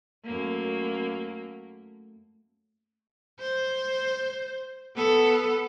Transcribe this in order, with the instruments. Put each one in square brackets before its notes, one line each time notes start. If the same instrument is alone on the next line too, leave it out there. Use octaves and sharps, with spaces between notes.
[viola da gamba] F#2 A3 A#3
[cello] C5
B3 A4